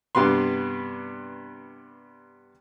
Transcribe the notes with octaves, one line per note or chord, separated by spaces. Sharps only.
G2 C3 B3 B4 C6